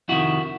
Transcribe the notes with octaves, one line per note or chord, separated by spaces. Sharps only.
F2 C3 D#3 E4 F#4